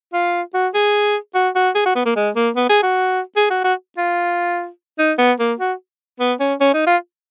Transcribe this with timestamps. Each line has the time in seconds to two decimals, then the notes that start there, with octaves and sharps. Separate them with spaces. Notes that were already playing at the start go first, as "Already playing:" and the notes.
0.14 F4
0.54 F#4
0.74 G#4
1.35 F#4
1.56 F#4
1.75 G#4
1.86 F#4
1.96 B3
2.06 A#3
2.16 G#3
2.36 A#3
2.56 B3
2.69 G#4
2.83 F#4
3.37 G#4
3.51 F#4
3.64 F#4
3.98 F4
4.99 D#4
5.18 B3
5.39 A#3
5.59 F#4
6.20 B3
6.40 C#4
6.61 C#4
6.74 D#4
6.87 F4